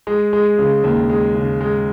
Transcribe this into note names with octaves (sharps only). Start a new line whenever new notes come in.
G#3
G#3
C#3
D#2
G#3
C#3
G#3